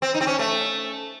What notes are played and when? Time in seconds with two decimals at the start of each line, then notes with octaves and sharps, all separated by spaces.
0.02 C4
0.14 D#4
0.21 C4
0.27 C#4
0.39 A3